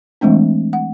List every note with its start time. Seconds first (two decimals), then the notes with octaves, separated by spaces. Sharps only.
0.21 E3 G#3 A3 C4 D4
0.73 F#5